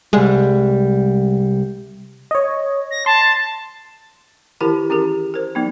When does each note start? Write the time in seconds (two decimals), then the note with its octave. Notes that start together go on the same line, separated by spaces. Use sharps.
0.13 C2 G3 G#3
2.31 C#5 D#5
2.91 A#6
3.06 A5 C6
4.61 D#3 E3 E4 G4 A#4 A5
4.90 C#4 G4 G#4 A#4
5.34 A#4 C5
5.55 F#3 B3 D#4